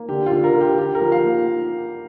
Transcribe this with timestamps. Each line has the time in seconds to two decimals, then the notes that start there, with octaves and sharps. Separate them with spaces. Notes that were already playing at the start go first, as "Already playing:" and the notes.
Already playing: A#3
0.09 D3 G4
0.26 F4
0.32 D3
0.44 A#4
0.54 D3
0.61 G4
0.78 F4 G4
0.95 A#4
1.01 F3
1.12 F5
1.24 A#3